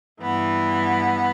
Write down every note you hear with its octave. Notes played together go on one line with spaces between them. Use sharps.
G2 E3 B3